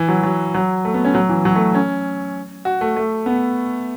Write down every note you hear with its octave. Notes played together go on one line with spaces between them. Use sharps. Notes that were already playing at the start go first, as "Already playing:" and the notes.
Already playing: E3
F#3
F#3
F#3
A3
B3
C#4
F#3
E3
F#3
A3
C#4
F#4
A3
A3
B3